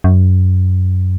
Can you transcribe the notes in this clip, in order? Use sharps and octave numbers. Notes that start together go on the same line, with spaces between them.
F#2